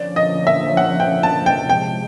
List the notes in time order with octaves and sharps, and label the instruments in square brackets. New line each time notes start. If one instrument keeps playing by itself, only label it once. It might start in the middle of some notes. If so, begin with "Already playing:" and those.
Already playing: [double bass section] D3 F3 A#3 C#4 [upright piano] D5
[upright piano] D#5
E5
F#5
G5
A5
G5
[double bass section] C3 F3 G#3 [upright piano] G5